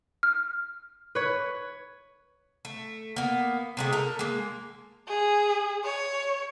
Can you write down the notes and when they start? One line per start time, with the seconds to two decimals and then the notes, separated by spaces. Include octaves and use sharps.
0.23 F6
1.15 B4 C#5
2.65 A3
3.16 A#3 B3
3.77 C3 G#3 A3
3.93 A4 A#4
4.19 G#3 A#3
5.08 G#4
5.84 C#5